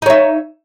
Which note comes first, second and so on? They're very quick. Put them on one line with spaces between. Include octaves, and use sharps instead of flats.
D#4 C#5 E5